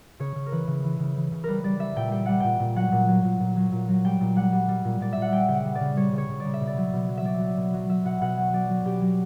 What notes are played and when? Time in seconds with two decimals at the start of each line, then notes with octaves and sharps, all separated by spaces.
0.20 C#3 C#5
0.36 C#3
0.46 A#4
0.52 E3 B4
0.67 C#3
0.84 E3
0.99 C#3
1.16 E3
1.32 C#3
1.44 G3 A#4 B4
1.64 G3 D5
1.79 G3 E5
1.96 A#2 G5
2.12 G3 G5
2.26 G3 F#5
2.40 A#2 G5
2.60 A#2
2.76 F#3 F#5
2.92 A#2
3.08 F#3
3.24 A#2
3.40 A#2
3.56 F#3
3.72 A#2
3.89 F#3
4.04 G3 G5
4.21 A#2
4.36 G3 F#5
4.52 G3
4.68 G3
4.85 A#2
5.00 A#2 D5
5.13 A#2 E5
5.22 F#5
5.32 G3 G5
5.49 C#3 G5
5.54 F#5
5.65 G3
5.75 D5
5.81 C#3
5.97 G3 C#5
6.13 C#3
6.18 C#5
6.29 C#3
6.40 C#3 D5
6.54 E5
6.61 B2
6.67 D5
6.77 F#3
6.93 B2
7.09 F#3
7.17 E5
7.25 F#3 D5
7.41 F#3
7.57 B2
7.74 F#3
7.89 F#3 E5
8.05 B2 F#5
8.21 B2 F#5
8.37 F#3
8.53 F#3 D5
8.69 F#3
8.85 B2 G4
9.01 F#3